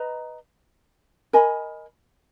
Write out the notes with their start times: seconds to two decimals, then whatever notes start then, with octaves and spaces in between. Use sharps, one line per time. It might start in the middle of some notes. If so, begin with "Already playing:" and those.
Already playing: B4 D#5 A#5
1.33 A#4 D#5 G#5 B5